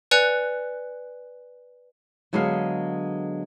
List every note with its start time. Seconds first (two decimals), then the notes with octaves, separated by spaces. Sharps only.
0.11 B4 D5 G#5 F#6 C#7 F7
2.33 D3 F#3 G#3 B3 C5 F5